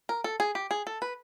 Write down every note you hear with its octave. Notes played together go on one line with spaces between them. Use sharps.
A#4
A4
G#4
G4
G#4
A4
B4